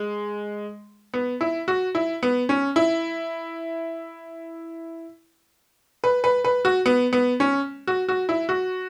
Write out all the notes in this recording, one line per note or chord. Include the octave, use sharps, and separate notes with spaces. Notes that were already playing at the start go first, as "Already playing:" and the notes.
Already playing: G#3
B3
E4
F#4
E4
B3
C#4
E4
B4
B4
B4
F#4
B3
B3
C#4
F#4
F#4
E4
F#4